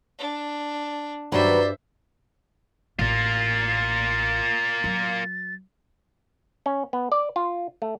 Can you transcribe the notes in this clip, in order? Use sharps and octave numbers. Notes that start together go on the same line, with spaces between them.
D4
G2 D#3 F#3 G3 B4 C5 D5 E5
A1 A#3 F4 A6
F#3
C#4
B3
D5
F4
A3